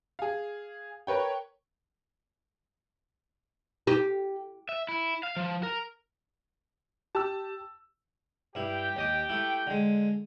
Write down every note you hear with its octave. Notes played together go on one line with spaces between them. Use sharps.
G#4 F5
A#4 B4 C#5 G5
G4
E5
E4
F5
F3
A#4
G4 A5 E6
G2 E4 G4 G5
D#2 D#5 D6
A3 E4
D3 G#3